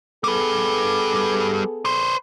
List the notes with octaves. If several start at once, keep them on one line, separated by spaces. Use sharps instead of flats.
G3 B3 G#4 A4 B4
B4 C5